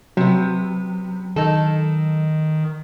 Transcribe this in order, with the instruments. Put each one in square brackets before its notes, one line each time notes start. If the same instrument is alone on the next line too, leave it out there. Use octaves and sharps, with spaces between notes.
[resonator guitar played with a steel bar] C3 B3 [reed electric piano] F#3
[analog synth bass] D#3 [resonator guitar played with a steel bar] D#4 A4